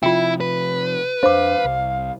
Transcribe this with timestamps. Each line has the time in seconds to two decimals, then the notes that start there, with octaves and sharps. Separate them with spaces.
0.03 C3 F3 E4 F4 G5
0.40 B4
1.23 F2 D4 C5 F5 D6
1.65 C2